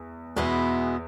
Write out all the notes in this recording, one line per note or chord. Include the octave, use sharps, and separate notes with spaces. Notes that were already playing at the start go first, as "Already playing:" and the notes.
Already playing: E2
E2 B2 G#3 B3 E4